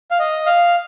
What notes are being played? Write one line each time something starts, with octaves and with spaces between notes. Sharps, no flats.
F5
D#5
F5